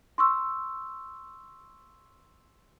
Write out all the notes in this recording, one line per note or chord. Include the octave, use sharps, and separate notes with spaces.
C6 C#6 E6